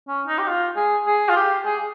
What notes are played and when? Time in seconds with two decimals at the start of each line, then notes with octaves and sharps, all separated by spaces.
0.08 C#4
0.27 D#4
0.38 G4
0.47 F4
0.76 G#4
1.06 G#4
1.29 F4
1.36 G4
1.65 G#4